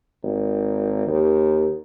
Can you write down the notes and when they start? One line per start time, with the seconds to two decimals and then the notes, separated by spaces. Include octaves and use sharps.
0.23 G#1
1.07 D#2